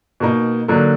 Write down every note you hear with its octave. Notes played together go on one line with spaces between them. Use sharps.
B2 A#3 D#4
D3 F#3 A#3 D#4